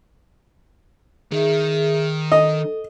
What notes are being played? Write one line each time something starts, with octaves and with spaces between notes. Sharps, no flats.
D#3 G#4 E5
A4 D#5